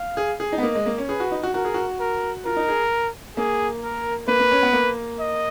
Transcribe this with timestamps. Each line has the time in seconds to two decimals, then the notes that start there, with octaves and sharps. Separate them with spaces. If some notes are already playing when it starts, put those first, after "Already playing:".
Already playing: F5
0.17 G#4
0.40 G#4
0.52 D#4
0.58 B3
0.63 A#3 D#5
0.75 G#3
0.86 A#3
0.98 C#4
1.09 G#4 B4
1.20 F#4
1.32 D#4
1.43 F#4
1.54 F#4 A#4
1.65 G#4
1.74 F#4
2.00 A#4
2.45 F4 A#4
2.57 D#4
2.69 G#4
3.37 A#3 G#4
3.83 A#4
4.28 A#3 B4
4.40 A#3
4.51 C#4
4.63 B3
4.73 A#3
5.20 D#5